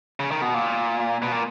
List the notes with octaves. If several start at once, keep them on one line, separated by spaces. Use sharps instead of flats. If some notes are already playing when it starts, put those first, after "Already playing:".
C#3
D#3
B2
A#2
B2
A#2